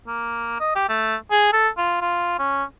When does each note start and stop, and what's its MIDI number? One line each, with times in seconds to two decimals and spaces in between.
0.07 0.58 58
0.60 0.74 75
0.76 0.86 67
0.89 1.16 57
1.31 1.48 68
1.53 1.68 69
1.77 1.99 65
2.01 2.35 65
2.39 2.64 61